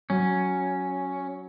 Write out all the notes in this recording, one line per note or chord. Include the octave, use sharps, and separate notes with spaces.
F#3 C#4